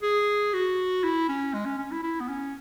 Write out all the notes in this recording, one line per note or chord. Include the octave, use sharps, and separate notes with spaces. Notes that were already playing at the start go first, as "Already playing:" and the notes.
G#4
F#4
E4
C#4
G#3
C#4
C#4
E4
E4
B3
C#4